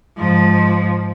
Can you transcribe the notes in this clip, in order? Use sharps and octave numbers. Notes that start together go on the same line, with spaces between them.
G#2 F3